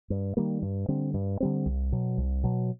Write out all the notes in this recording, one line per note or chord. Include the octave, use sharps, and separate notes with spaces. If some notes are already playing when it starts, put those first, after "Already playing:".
G2
D#3 G3 A#3
G2
D3 G3 C4
G2
D3 G3 C4
C2
B2 F#3
C2
B2 F#3